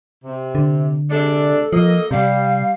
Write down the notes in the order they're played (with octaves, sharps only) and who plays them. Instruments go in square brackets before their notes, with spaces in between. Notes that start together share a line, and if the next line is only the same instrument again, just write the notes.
[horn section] C3
[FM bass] D3
[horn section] C3 G#3 D4 [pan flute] A4
[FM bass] F3 [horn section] A#3 D#5
[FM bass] C3 [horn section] G3 [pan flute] F5